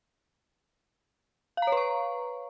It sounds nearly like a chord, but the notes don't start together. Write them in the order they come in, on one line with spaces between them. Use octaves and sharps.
F5 A#5 C#5 B4 C#6